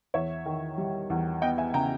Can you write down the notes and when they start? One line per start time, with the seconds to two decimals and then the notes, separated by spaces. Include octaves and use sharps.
0.14 E2 C#5 E5
0.46 D#3
0.78 G3
1.10 E2
1.42 B3 D#5 G5
1.58 E5 G#5
1.74 C#3 G5 A#5